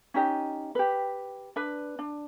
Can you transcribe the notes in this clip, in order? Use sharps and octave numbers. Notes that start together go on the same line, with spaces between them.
C#4 D#4 G4 D#5
G4 B4
D4 B4
D4